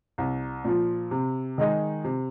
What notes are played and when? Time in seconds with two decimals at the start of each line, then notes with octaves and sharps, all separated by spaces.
0.18 C2
0.65 A#2 F3
1.11 C3
1.58 D#3 G#3 D#4 G#4
2.04 C3